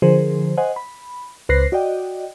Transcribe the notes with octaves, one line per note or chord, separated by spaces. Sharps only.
D3 F3 G#4 A#4 C5
C5 D#5 F#5 G#5
B5
C#2 B4 C5 F#6 A#6 C7
F#4 D5 D#5 G5